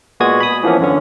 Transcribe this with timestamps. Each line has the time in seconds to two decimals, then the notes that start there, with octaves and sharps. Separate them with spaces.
0.20 A#2 G#3 B3 F#4 D#6 G#6
0.40 B5 D#6
0.63 E3 F3 A#3 B3 C#4
0.80 F#2 D3 C#4